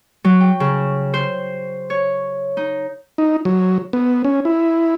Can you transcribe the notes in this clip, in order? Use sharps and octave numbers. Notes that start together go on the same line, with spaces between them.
F#3
G5
C#3
C5
C#5
D#4
D#4
F#3
B3
C#4
E4